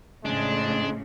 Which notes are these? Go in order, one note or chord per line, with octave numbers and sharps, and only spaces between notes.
F2 A2 C#3 G#3 D4